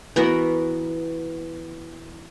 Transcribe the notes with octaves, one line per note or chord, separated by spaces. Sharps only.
E3 B3 F#4 A#4